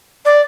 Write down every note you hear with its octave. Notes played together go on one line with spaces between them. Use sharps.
D5